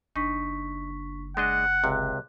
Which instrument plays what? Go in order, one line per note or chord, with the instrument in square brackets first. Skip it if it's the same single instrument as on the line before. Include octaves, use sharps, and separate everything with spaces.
[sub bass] F#1 [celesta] D4 C#6 B6 [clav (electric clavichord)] D#4
[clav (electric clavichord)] G#3 D4 D#5 [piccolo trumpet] F#5
[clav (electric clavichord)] C#2 C3 [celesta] F#6